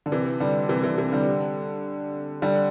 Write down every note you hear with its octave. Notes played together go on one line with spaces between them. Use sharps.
D3
C3 E3
D3 G3
C3 E3
C3 E3
C3 E3
D3 G3
D3 G3